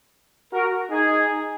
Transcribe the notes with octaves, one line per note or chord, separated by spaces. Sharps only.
F#4 A#4
D#4 G#4